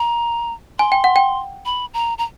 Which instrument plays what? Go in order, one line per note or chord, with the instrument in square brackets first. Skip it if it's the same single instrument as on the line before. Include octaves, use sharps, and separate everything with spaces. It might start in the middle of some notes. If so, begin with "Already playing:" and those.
Already playing: [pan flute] A#5
[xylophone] G#5 [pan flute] C6
[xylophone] G5
F#5
G5
[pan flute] B5
A#5
A#5